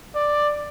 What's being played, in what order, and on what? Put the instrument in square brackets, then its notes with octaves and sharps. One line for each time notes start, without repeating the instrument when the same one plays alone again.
[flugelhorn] D5